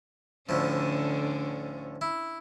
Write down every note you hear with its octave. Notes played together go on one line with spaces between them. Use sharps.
D2 A2 D3 F3 C#4
E4